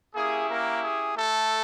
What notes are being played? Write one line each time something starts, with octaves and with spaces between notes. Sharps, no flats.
A#3 C#4 E4 G4 G#4
A#3 A#4
G#4
A3 A4